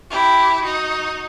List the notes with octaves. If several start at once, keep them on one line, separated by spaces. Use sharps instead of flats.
E4 G4
D#4 F#4